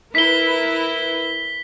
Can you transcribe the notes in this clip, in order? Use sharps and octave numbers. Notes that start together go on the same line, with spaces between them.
E4 A#4 B4 B6 G7